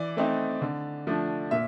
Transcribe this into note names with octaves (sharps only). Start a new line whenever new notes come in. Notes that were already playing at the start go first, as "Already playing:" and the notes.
Already playing: E3 D5
A3 C4 D#4
D3
F3 A3 D4
A#2 E5